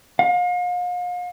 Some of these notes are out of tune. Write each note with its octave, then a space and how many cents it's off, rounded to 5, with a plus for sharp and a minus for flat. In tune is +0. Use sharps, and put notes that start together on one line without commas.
F5 +40